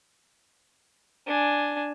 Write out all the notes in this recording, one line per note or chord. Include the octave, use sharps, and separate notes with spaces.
D4 G#5